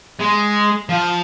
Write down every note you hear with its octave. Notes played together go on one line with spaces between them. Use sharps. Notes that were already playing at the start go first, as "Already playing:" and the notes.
G#3
F3